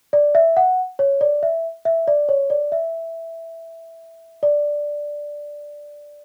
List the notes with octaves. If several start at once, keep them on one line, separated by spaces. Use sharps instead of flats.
D5
E5
F#5
C#5
D5
E5
E5
D5
C#5
D5
E5
D5